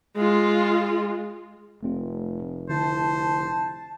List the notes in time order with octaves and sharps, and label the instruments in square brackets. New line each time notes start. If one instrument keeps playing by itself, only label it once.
[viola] G#3 F4
[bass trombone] F1 [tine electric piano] A3 C4 F4
[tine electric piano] D3 E4 [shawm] C5 [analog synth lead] A5